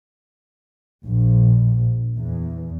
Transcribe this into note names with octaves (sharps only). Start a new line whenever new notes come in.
A#1
E2